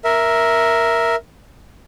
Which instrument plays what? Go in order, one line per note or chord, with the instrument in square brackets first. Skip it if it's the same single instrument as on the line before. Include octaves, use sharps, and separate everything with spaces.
[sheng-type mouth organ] A#4 E5